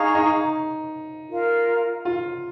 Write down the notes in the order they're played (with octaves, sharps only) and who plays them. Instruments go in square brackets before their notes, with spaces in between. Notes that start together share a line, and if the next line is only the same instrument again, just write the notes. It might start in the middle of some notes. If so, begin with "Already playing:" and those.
Already playing: [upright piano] D#4 [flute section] G#4 F5 A#5 C#6
[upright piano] D#4
[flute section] F4 A#4 F5
[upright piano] F4